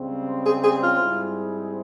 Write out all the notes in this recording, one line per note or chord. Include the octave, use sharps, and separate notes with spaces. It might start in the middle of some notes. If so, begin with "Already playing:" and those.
Already playing: C#2 C#3 G3 C4
G#4
G#4
F4
G#2 G3 C4 E4 G#4